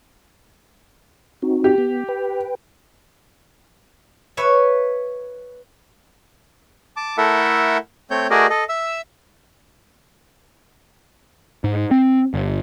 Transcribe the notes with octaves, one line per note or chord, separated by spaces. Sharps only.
C4 D#4 F#4
G4
B3
B4 G5
B4 C#5 E5
A5 D6
A3 E4 A4 A#4 E5 F#5
A3 C4 C#5 G6
A3 F#4 G#4 A#4 D5 D#5
A4 D#5
E5 E6
G#2
C4
G1